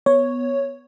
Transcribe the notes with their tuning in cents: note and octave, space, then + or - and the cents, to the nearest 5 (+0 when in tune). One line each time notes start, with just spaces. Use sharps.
B3 +0 C#5 +0